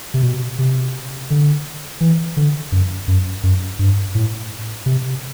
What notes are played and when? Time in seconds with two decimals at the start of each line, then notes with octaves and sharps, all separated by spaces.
0.14 C3
0.22 B2
0.59 C3
1.30 D3
2.01 E3
2.37 D3
2.72 F#2
3.08 F#2
3.43 F#2
3.79 G2
4.15 A2
4.86 C3